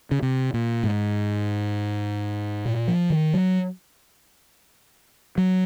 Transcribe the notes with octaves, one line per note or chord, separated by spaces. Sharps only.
C#3
C3
A#2
G#2
A#2
F3
D#3
F#3
F#3